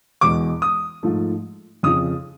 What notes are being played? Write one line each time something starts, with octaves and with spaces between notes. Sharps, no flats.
E2 B2 G#3 D6
D#6
G#2 F3 A3
F2 C#3 F3 D#6